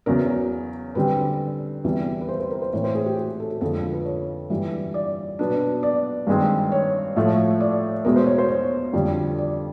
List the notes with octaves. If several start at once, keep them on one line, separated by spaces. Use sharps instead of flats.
E2 C#3 F#3 A#4
D3 G3 C4 B4
E2 C3 E3 G3
B4
C5
C5
A#4
C5
A2 E3 A3 C4 C#5
C5
G#4
G4
F#4
A4
A4
F2 D3 F3 G#3 A4
B4
C#5
G2 E3 G3
D5
B2 F#3 B3 D4
D5
G2 D#3 G#3 C4
C#5
A2 F3 A3
D5
E2 B2 G#3 A#4
C5
C#5
C5
C#5
F2 D3 G3
D5